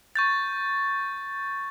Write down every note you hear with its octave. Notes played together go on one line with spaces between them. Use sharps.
C#6 G6 A6